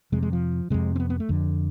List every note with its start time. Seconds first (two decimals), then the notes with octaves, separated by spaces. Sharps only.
0.12 F2 C3 G#3
0.23 G#3
0.33 F3
0.70 F2 C3 G#3
0.96 C4
1.00 B3
1.10 B3
1.20 A3
1.29 F2 D3